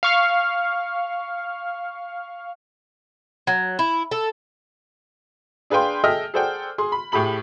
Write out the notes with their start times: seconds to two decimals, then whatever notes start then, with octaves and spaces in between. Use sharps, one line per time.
0.03 F5 C#6 F6
3.47 F#3
3.79 E4
4.11 A4
5.70 D4 G#4 B4 F5 G5 C6
6.04 G#4 A4 D#5 E5 G5 F6
6.34 G#4 A4 C5 D5 F#5 G5
6.78 G#4 C6
6.92 B5
7.12 A2 G4 G#4 B5 F#7